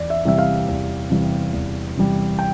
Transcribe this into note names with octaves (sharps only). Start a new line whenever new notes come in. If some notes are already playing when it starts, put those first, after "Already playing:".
Already playing: E2 D5
E5
C3 E3 G3 E5
F5
E2
C3 E3 G3
E2
C3 E3 G3
G5